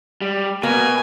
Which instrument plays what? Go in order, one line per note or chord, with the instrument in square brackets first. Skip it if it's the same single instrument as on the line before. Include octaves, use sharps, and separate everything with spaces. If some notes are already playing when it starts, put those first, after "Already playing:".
[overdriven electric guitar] G3
[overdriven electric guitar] B2 [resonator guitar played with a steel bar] A#3 [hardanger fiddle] G#5